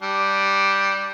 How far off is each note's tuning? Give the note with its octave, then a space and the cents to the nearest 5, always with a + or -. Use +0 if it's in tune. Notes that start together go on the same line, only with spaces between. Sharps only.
G3 +0 D4 +5